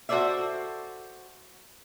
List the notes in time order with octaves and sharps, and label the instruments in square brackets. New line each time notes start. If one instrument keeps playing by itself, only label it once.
[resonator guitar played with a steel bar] F#4 A4 C5 D5 E5